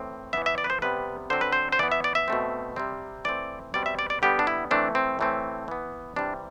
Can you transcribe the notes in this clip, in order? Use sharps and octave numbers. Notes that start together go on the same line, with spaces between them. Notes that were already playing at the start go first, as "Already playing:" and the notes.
Already playing: A2 E3 A3 C4
E3 B3 E5
E5
D5
B4
C5
C3 G3 B3 B4
D3 F#3 C4 C5
B4
C5
C5
E3 B3 D5
E5
D5
E5
B2 A3 C4
C3 G3 C4
E3 A3 C4 D5
B2 G3 C4 D5
E5
D5
D5
D3 G3 B3 G4
D4
E4
E3 A3 C4 D4
C4
A2 E3 A3 C4
E3 B3
C3 E3 G3 D4